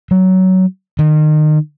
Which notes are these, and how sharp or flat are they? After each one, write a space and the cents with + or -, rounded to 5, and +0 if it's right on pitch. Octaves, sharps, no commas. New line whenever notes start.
F#3 +15
D#3 -30